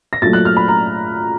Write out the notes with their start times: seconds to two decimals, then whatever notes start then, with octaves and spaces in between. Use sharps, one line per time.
0.13 A#6
0.22 A#2 F#3 A3 A6
0.33 F#6
0.45 F6
0.57 B5
0.68 A#5